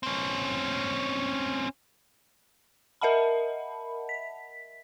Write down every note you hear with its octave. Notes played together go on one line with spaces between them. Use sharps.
C4 C#4
A#4 D#5 E5 F#5 A5 B5
B6